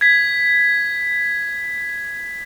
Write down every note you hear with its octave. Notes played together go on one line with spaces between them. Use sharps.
G#6 B6